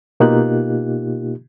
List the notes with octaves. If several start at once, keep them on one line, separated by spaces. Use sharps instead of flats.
B2 A#3 D#4 F4 G4 F#6